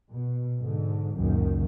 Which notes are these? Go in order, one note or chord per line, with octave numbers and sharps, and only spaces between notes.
B2
G#2 D3
C#2 F#2 A#2 D#3